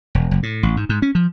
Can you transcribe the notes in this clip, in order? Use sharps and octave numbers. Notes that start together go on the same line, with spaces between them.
E1
F#1
A2
A1
G#2
G#2
C#4
F3